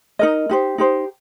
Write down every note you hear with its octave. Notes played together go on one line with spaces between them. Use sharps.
D#4 A#4 D#5
D#4 G4 C5
D#4 G4 C5